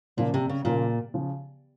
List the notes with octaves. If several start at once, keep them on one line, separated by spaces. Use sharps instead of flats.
A#2 C#3 F3 A#3 C#4 F4
C3
C#3
A#2 C#3 F3 A#3 C#4 F4
C#3 F3